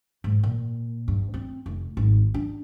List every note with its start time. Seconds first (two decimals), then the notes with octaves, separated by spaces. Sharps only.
0.24 G#2
0.43 A#2
1.08 G2
1.34 C4
1.66 F1
1.97 G#1
2.34 D4